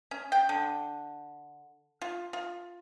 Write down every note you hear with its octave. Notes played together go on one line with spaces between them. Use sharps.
C#4
G5
D3
F4
F4